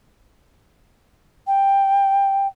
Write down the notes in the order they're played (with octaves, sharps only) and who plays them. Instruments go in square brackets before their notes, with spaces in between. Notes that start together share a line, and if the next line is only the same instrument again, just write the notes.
[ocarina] G5